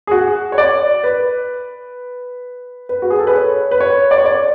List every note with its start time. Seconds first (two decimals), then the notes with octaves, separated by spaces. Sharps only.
0.07 G#4
0.11 F#4
0.52 C#5
0.58 D5
1.04 B4
2.89 B4
3.02 F#4
3.10 G#4
3.19 A4
3.27 B4
3.35 C#5
3.71 B4
3.80 C#5
4.11 D5
4.18 C#5
4.25 D5